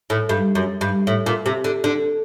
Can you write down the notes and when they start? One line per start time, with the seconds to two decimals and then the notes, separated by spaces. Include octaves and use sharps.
0.10 A2
0.29 G2
0.55 F#2
0.81 G2
1.07 A2
1.26 A#2
1.46 C3
1.64 D3
1.84 D3